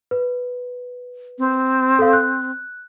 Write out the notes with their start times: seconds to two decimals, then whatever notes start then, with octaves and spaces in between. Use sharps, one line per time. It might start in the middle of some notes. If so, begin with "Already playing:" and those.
0.11 B4
1.38 C4
1.99 A4 F5
2.13 F#6